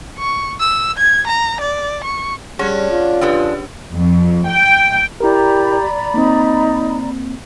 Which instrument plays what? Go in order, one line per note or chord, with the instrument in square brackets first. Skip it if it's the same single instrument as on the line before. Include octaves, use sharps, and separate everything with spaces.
[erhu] C#6
E6
G#6
A#5
D5
C#6
[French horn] G3 [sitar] C#4 [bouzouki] D4 [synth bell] G#4 F#5
[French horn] F4
[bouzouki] D3 F3 G#4 [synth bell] D4 G4 B4
[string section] F2
G5
[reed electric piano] E4 A#4 [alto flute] G4 [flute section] D5 A#5 B5
[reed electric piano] A#3 C4 [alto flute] D#4